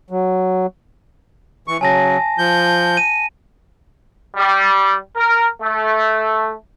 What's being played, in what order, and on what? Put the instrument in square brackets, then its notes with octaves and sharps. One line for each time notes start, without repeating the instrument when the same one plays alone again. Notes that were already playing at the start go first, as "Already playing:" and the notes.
[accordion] F#3
E3 C#6
[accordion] C#3 F#3 [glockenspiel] G#5 A5 A#6
[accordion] F3 G6
[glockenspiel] D#7
[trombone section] G3
A#4
A3